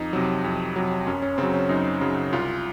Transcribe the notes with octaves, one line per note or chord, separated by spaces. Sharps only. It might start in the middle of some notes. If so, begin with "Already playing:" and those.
Already playing: F2 D#4
C3 F#3
F2
C3 F#3
F#2 C#4
C#4
C#3 F#3 C4
C#4
F#2 D#4
C#3 F#3
C2 F4